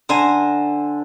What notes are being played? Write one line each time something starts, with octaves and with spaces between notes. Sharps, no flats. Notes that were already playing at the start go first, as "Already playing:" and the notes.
D3 C5 G#5 A#5